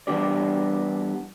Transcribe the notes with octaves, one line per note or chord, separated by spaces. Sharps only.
E3 G3 B3 D4 G4 D5